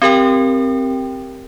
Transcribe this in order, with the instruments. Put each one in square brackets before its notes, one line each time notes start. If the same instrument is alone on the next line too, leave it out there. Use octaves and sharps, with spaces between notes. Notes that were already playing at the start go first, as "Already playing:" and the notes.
[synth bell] C4 G4 A#4 G5